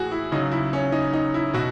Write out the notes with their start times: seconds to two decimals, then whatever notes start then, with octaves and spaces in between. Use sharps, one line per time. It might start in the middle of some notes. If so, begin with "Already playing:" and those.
Already playing: A2 E3 F#4 G#4
0.11 E4
0.32 C#3 D#4
0.35 F#3
0.52 E4
0.73 C#4
0.92 D#4
1.13 D#4
1.34 E4
1.54 B2 F#4